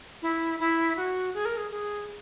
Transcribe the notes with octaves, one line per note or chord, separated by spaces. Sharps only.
E4
E4
F#4
G#4
A#4
G#4
G#4